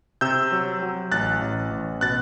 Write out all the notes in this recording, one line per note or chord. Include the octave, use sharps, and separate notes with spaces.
C3 E6 G6
F#3
F#3
A1 F#6 A6
A1
A1
B2 F#6 A6